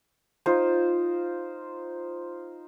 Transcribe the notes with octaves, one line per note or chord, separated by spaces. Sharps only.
D#4 F4 C5